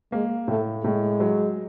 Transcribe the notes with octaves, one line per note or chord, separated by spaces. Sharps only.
G#3 A#3
A2 A3
A2 G#3
F#3